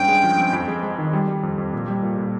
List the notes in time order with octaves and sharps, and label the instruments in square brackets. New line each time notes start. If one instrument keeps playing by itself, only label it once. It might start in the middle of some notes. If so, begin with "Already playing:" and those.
Already playing: [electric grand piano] G2 C#4 [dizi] G5
[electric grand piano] G#3
F3
C4
F2
G#3
G#3
D#3
G3
G3
F2
F2
A#2
G3
A#2
A#2